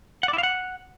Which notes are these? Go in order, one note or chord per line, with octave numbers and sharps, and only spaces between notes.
F#5
D5
E4
F5
F#5